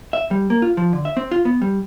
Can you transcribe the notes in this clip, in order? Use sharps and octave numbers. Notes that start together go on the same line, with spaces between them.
E5
G3
A#3
F4
F3
D3
E5
C4
F4
B3
G3